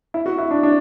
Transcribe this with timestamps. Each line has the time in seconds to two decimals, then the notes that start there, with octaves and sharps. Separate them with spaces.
0.14 E4
0.26 F#4
0.38 E4
0.51 D4
0.63 D4